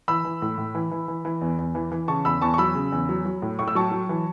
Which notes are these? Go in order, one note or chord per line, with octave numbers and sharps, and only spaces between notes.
E3 B5 E6
E3
A2
A2
E3
E3
E3
E3
E2
E2
E3
E3
C#3 A5 C#6
E2 B5 E6
E2 A5 C#6
C#6
F#3 B5 E6
C#3
E2
F#3
F#3
A2
A2 C#6
E6
F#3 A5 C#6
F#3
E3